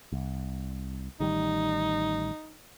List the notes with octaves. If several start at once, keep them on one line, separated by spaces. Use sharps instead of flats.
C2
A1 D#3 G3 D#4